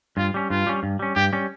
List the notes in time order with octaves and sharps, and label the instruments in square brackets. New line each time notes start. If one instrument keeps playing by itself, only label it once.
[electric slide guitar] G2 [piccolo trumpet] F4
[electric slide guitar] G3 C#4
[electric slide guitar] G2 [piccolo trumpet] F4
[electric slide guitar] G3 C#4
G2
G3 C#4
[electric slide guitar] G2 [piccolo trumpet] G4
[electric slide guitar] G3 C#4